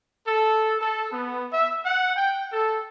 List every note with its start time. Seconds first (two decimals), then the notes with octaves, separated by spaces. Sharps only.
0.26 A4
0.80 A4
1.12 B3
1.51 E5
1.84 F#5
2.16 G5
2.52 A4